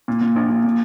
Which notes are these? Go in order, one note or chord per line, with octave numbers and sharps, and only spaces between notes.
A#2
A#2
A#1
A#1
A#2